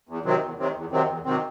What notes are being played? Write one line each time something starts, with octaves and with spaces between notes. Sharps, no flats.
E2
C3 D#3 F#3 C4
E2
C3 D#3 F#3 C4
E2
C3 D#3 F#3 C4
E2
C3 D#3 F#3 C4